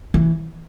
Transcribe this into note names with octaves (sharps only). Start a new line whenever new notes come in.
E3